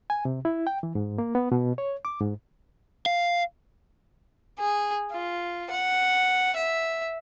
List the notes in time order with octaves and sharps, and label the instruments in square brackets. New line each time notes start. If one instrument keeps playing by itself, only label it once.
[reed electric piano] G#5
C3
E4
G5
E3
G#2
A#3
B3
B2
C#5
D6
G#2
[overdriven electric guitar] F5
[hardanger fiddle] G#4
F4
F#5
E5